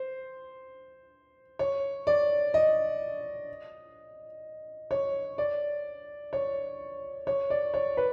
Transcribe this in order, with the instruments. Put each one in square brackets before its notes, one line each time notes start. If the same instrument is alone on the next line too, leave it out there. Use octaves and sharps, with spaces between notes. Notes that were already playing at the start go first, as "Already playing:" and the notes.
Already playing: [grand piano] C5
C#5
D5
D#5
C#5
D5
C#5
C#5
D5
C#5
B4